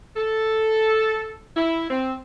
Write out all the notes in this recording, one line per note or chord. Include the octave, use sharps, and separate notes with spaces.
A4
E4
C4